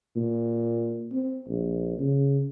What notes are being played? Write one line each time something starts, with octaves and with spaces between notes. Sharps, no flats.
A#2
C4
A#1
C#3